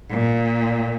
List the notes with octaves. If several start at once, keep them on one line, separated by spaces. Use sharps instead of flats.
A#2